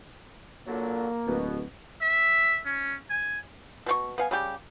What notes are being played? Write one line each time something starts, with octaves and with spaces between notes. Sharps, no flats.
A#2 D3 F#3 A#3
D1 B2
E5
C#4
G#5
B2 C4 C#6
B3 F5 G#5
C#3 G3 G4